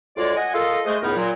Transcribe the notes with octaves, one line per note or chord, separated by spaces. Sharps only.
D2 G#3 F4 C#5 D5
D#5 F#5 G#5
F4 A4 A#4 D#5
G#3 A3 C5 D#5
C#2 A2 B3 D#4 E4 A#4
A#2 F#3